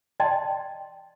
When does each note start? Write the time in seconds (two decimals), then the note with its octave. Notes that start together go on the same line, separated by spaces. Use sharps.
0.20 D5 D#5 G5 A5 C6